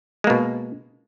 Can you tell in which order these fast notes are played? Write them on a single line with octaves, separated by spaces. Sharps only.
G#3 A#3 B2